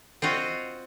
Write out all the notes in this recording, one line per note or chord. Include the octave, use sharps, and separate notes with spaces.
C4 F4 F#4 D#5